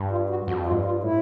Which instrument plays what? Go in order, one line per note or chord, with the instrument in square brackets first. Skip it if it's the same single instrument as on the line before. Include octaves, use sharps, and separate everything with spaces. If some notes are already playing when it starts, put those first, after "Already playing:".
Already playing: [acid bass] G2
[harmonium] F4
F#4
[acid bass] F2 [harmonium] F#4
[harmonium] F4
[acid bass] G#2
G2
[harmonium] F4
[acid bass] A2 [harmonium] E4